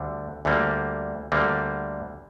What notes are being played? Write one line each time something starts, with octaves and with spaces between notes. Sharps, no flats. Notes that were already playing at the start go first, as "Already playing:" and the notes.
Already playing: D2 D3 G3
D2 D3 G3 A#3
D2 D3 G3 A#3